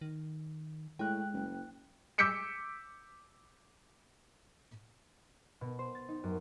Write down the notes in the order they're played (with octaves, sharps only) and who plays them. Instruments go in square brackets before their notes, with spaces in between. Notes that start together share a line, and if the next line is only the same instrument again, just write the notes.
[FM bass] D#3
[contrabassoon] A2 [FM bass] G#3 [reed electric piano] G5 F#6
[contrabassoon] F#1
[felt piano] D6 E6 G6 B6 C#7 D7
[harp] B2
C5
A6
D#4
F#2